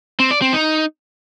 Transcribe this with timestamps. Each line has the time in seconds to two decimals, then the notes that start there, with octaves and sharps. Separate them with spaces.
0.20 C4
0.31 D5
0.42 C4
0.53 D#4